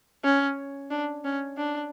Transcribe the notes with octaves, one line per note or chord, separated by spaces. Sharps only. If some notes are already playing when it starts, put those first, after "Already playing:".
C#4
D4
C#4
D4